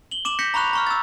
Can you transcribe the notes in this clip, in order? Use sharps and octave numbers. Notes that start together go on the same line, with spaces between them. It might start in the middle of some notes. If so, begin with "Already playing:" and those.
F#7 G7
D6 E7 F#7
G6 A#6 B6 C#7
A#5 B5 C#6 F#6 F7
A#5 C#6 F6
E6 A6